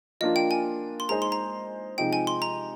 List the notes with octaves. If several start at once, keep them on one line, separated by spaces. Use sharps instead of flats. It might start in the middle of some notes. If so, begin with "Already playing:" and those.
F3 A#3 D4 F4 D#5
G5
G#5
C6
G#3 D#4 G#4 C5 D#5 A#5
C6
A#5
C3 F3 G#3 D#4 G5
G#5
C6
A#5